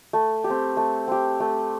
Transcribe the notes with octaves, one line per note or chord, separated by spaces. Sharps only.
A3
G4
C4
A3
C4 G4
A3